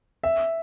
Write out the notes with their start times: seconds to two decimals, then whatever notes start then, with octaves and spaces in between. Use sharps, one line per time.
0.23 E5